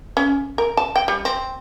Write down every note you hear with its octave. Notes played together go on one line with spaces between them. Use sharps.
C#4
A#4
A5
G5
G3
C4